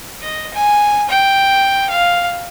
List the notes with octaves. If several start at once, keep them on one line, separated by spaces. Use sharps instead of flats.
D#5
G#5
G5
F5